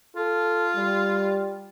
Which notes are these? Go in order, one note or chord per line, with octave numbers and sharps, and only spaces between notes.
F4 A4
G3